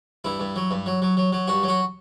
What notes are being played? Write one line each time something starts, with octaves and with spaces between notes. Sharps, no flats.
G2 E4
G2
F#3
G2
F#3
F#3
F#3
F#3
G2 F#4
F#3
F#4